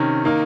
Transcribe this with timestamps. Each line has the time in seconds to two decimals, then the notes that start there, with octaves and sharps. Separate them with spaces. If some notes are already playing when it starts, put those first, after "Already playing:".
Already playing: C3 D#3 C#4
0.24 D#3 A#3 D#4